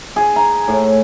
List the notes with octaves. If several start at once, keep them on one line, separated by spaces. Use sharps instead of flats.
G#4
A#5
A2